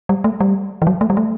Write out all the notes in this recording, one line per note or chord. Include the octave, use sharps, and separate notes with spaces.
G3
A3
G3
E3
F#3
A3
G3
A3